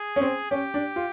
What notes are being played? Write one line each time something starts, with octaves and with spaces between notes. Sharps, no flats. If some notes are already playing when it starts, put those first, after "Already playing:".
Already playing: G#4
C#4
C4
C#4 G4
D4
F4